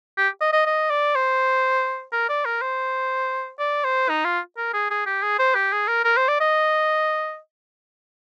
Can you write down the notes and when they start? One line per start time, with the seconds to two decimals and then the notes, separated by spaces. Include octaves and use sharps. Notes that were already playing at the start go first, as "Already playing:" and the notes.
0.18 G4
0.41 D#5
0.53 D#5
0.66 D#5
0.90 D5
1.15 C5
2.12 A#4
2.29 D5
2.45 A#4
2.62 C5
3.59 D5
3.84 C5
4.09 D#4
4.25 F4
4.58 A#4
4.74 G#4
4.91 G#4
5.07 G4
5.23 G#4
5.39 C5
5.55 G4
5.72 G#4
5.88 A#4
6.05 A#4
6.17 C5
6.28 D5
6.41 D#5